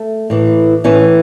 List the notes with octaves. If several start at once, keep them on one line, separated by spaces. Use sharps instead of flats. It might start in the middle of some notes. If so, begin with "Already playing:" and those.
Already playing: A3
A2 E3
A2 E3 C#4